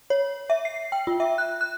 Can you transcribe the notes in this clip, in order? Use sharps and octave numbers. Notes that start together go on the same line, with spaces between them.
C#5
E5
C7
G5
F4
E5
F#6
F#6